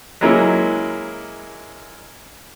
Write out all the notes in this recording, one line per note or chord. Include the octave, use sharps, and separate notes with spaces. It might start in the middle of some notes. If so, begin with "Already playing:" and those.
F#3 G#3 A#3 C#4 E4